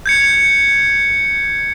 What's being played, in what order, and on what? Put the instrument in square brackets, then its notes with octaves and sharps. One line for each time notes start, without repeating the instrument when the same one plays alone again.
[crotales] G6 G#6 C#7